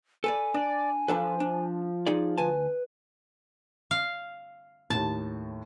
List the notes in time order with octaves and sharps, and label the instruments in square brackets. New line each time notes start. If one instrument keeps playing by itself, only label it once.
[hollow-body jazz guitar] A4 B4 D5 [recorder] G#5
[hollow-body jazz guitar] D4 [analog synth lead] D5
[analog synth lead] F3 [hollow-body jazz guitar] D4 A4 B4
[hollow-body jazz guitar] D4
D#4 G#4 D5
[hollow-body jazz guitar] D2 G#5 A5 [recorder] B4
[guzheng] F5
[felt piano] D#2 A2 [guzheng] A5